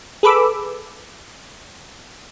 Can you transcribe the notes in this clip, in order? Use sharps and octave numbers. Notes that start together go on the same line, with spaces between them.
G#4 A4 B4 B5 D6 E6